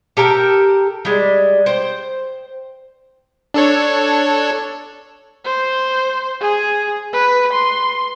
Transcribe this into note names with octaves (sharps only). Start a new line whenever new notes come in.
G4 A4 A#4 G5
G3 G#3
C5 G5
D4 A4 C#5
C5
G#4
B4
C6